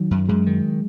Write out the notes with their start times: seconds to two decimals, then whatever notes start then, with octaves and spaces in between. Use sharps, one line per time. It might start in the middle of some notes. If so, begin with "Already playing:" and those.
Already playing: D#3 F#3
0.11 F#2
0.29 F#2 G#3
0.46 D#3